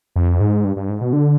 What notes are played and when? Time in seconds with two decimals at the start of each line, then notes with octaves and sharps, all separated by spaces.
0.16 F2
0.40 G#2
0.64 G2
0.77 G2
0.89 G#2
1.01 B2
1.13 D3